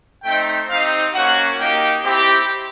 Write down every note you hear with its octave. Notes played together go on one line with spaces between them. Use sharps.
A3 C4 D#4 G5
C4 D#4 G4 F5
A#3 C#4 F#4 F#5
A#3 D#4 G4 G5
C4 E4 G4